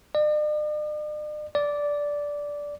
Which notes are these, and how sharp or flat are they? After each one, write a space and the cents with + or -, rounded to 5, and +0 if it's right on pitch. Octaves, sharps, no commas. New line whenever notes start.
D5 +45
D5 -10